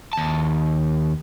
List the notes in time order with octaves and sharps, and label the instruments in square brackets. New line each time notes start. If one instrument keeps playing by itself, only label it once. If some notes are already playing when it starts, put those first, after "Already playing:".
[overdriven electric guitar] D#2 A5